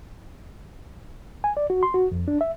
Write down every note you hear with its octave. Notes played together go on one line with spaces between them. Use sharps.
G#5
D5
F#4
C6
F#4
F2
D4
E5